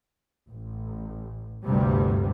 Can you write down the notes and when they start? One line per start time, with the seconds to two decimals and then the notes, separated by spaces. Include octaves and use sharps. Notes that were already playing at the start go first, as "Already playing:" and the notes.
0.50 A1
1.65 G1 D2 G2 C3 G3